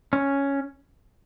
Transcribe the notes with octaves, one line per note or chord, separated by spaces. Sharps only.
C#4